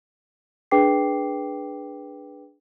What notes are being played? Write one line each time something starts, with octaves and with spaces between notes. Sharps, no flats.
D4 G#4 B4 G5 D6 C7